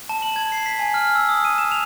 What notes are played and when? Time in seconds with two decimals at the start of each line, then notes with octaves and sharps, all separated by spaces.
0.09 A5
0.22 F#7
0.36 G#6
0.52 C7
0.66 B6
0.79 G#5
0.94 F6
1.15 E6
1.29 D#6
1.45 D#7
1.58 E7
1.72 F7